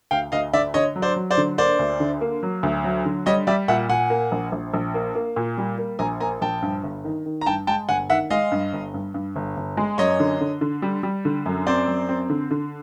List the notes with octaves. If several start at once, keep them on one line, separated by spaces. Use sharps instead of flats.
D2 F5 G5
D2 D#5 F5
D3 D5 E5
D3 C#5 D#5
F#3
C5 D5
F#3
C5 D5
D3
A#3 C5 D5
D2
D3
A#3
F#3
D2
F#3
D3
G3 C#5 D#5
G3 D5 E5
A#2 E5 F#5
A#2 F#5 G#5
A#3
A#1
A#1
A#1
A#3
A#3
A#2
G3
A#3
A#1 G#5 A#5
A#3 G#5 A#5
A#1 G5 A5
G2
G1
D#3
D#3
A#5
G2 G5 A5
G#3 G5 A5
G1 F#5 G#5
D#3 E5 F#5
G#3 D#5 F5
G2
G1
G2
G2
G1
G1
G#3
F#2 C#5 D#5
D3
D3
D3
G3
G3
D3
F#2
C4 C5 D5
F#2
C4
D3
D3